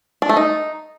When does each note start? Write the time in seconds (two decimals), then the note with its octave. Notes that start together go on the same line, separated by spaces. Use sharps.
0.22 D4
0.29 A3
0.37 D#4